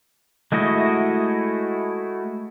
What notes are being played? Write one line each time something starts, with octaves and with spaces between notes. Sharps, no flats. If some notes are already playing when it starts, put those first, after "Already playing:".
G#3 A3 E4 F#4 D#5